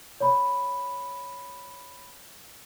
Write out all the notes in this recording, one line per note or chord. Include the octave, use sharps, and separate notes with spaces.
C#5 B5